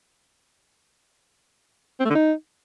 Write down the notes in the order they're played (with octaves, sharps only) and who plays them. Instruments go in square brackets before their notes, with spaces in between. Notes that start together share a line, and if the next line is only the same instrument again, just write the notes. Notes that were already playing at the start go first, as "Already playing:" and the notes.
[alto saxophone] C4
A3
D3
D#4